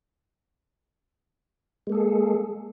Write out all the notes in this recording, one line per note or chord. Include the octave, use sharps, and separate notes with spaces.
G#3 A#3 G#4 A4